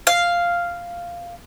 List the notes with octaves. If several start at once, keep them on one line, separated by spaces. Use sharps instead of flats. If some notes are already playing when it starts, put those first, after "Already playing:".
F5